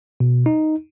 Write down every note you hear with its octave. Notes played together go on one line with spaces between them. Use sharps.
B2
D#4